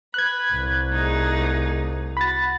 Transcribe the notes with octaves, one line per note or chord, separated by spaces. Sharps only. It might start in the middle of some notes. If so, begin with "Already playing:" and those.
B4 F#6 G#6
C2
A3 D#4 G#4
F#4 B5 A6